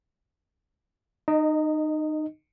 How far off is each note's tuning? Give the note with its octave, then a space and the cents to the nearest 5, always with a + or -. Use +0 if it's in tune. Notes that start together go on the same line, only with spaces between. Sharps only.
D#4 -25 D#5 +0